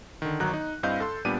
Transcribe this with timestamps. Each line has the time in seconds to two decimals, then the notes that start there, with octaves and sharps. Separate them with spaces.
0.22 D3 D#3
0.40 G1 D#3 F#3 A#5 F#6
0.53 D#4
0.83 G2 C4 E4 D#5 F5 G6
1.00 A4 C6
1.25 A#2 G3 B3 D4 D6 D#7